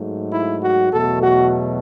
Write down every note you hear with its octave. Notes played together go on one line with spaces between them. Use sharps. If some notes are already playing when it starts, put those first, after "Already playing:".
Already playing: G#2 F#3 A3
E4
F#4
E2 B2 F#3 A3 A4
F#4